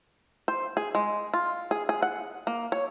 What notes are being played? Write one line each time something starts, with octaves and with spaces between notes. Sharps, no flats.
C5
G#4
G#3
F4
G#4
G#4
F#5
A#3
C#5